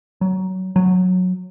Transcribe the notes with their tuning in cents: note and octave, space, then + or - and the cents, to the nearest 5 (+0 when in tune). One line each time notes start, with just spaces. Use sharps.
F#3 +20
F#3 -15